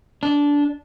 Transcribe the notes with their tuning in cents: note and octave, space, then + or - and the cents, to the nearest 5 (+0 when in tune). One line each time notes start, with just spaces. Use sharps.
D4 -15